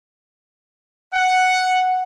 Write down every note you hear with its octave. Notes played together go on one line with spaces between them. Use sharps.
F#5